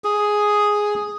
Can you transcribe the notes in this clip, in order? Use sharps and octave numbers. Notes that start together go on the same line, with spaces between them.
G#4